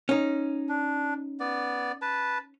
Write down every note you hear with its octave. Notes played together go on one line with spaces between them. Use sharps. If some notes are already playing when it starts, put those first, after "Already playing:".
C#4 D#4
D4
B3 D5
B4 A5